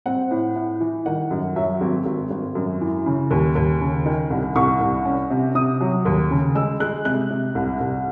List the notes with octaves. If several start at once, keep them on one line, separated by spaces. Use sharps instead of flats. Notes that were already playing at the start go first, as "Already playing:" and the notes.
C4 F#5
A2
A2
E3
D#3 F#5
F#2
F#3 E5
G#1
G#1
G#1
F#2
E3
C#3
D#2
D#2
C#3
D#3
C2
C2 C#6
C2
C#4
C3
C3 D#6
F#3
D#2
C#3
G#3 E6
G#3 F#6
C3 F#6
C3
C2
C2